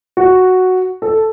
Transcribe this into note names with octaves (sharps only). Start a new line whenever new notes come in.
F#4
A4